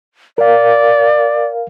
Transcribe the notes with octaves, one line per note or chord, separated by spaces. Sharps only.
A#4 D5 F5